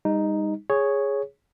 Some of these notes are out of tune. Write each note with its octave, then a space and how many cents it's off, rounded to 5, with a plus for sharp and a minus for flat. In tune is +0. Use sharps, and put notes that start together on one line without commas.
G3 +40 D#4 +0
G#4 +0 C#5 +0